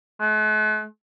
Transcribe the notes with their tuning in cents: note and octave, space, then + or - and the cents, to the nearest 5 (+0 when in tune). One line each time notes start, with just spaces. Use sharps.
A3 -45